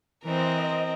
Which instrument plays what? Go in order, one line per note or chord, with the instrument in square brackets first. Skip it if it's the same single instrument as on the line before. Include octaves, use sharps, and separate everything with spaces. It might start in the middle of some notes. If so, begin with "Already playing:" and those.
[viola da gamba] E3 C5 [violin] C4 A#4 [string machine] D#5